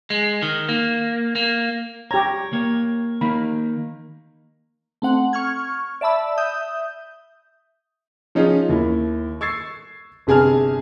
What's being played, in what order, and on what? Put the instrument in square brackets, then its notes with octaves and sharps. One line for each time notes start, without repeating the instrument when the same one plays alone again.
[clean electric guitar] G#3
D#3
A#3
A#3
[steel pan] G4 A#5 [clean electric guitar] C#5
[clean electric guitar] A#3 C#5
[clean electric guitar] D#3 A#3 D#4 [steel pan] B5
[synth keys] A3 C4 F#5
C#6 F6 G#6
D5 E5 A5 B5 E6
E5 D#6 G6
[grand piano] F3 C#4 D#4 F4 G#4
D#2 E4
C#6 E6 G#6 A6 C7
G1 C3 G#4 G#5 A5 F6